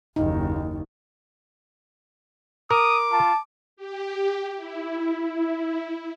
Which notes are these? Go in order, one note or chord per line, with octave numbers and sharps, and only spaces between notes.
F#1 D#2 D#4
A#4 D6 D#6
F4 A5
G4
E4